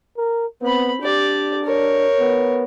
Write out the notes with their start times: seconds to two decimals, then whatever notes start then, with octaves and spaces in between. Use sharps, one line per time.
0.17 A#4
0.62 B3 C4 B5
1.01 D4 G4 D5
1.64 A#4 C#5
2.20 B3